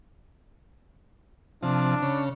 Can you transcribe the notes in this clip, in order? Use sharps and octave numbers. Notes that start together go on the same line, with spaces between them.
C3 F3 D4
C#3